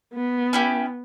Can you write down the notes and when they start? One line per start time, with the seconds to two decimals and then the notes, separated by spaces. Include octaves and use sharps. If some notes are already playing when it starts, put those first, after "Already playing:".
0.14 B3
0.53 C#4 E4 G4